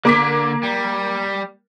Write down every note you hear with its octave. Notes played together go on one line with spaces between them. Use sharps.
D3 A#3 D6 B6
G3